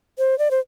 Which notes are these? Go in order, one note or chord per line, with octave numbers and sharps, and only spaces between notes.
C5
D5
C5